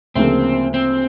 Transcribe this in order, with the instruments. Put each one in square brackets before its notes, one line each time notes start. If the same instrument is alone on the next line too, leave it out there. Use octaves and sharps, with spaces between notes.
[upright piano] D2 C#3 F3 A#3 [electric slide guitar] C4
[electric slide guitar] C4